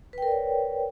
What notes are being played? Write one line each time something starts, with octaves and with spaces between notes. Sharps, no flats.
A#4 B4 C#5 D5 G5